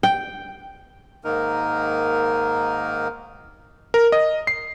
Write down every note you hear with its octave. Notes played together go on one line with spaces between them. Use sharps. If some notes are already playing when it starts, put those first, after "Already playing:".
G5
G#2 D#3 A#3 D#4 A#4
A#4
D#5
C7